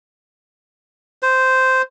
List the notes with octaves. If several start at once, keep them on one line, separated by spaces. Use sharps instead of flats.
C5